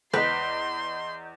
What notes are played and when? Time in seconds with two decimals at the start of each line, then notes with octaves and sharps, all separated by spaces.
0.14 E2 B4 D#5 C6 G6